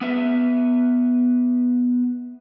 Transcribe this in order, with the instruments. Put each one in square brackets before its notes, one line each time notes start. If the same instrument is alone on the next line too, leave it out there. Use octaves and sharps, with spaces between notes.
[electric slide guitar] B3 B4 E5